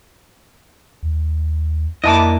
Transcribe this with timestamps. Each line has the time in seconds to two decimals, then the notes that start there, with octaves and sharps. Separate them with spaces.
1.03 D#2
2.04 F2 A#3 D4 E4 D#5 A5 D6